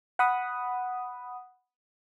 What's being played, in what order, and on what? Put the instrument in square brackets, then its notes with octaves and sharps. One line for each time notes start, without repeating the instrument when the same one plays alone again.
[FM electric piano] F#5 B5 D#6